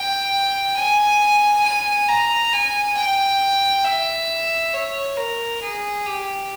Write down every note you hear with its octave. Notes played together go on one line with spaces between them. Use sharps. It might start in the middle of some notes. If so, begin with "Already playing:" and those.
Already playing: G5
G#5
G#5
A#5
G#5
G5
E5
C#5
A#4
G#4
G4